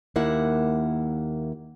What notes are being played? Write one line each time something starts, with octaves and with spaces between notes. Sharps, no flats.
D#2 A#3 E4 F#5